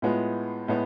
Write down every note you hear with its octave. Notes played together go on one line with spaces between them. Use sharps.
A2 G#3 B3 F4
A2 G#3 B3